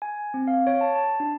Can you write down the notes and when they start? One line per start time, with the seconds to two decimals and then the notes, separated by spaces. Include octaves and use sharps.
0.02 G#5
0.34 C4
0.47 F5
0.67 C#5
0.81 A5
0.95 A5
1.20 D4